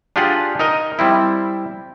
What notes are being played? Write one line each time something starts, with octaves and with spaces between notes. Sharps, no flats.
D4 F4 G4 G#4 F#5
D#4 A#4 D#5
G3 C4 E4